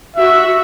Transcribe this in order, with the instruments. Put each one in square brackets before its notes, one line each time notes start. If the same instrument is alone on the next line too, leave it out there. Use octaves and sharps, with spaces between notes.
[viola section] F#4 [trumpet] E5